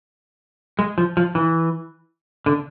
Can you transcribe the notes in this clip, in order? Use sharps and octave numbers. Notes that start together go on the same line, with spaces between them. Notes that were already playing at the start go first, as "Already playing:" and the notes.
G#3
F3
F3
E3
D3